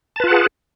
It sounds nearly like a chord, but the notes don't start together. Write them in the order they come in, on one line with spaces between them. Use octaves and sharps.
A5 B4 F4 F#5 G#4